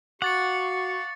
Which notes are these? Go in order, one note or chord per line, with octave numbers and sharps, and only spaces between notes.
F#4 F5 F#5 C#6 D6 A6 C#7